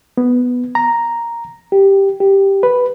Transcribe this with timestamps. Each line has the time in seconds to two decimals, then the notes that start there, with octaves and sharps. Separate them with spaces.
0.18 B3
0.75 A#5
1.72 G4
2.20 G4
2.63 B4